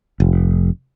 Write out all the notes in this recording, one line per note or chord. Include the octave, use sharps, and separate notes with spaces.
F1